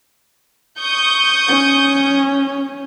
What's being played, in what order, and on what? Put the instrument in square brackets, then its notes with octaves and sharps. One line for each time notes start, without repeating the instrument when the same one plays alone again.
[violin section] C#6 D#6 G6
[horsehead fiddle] C#4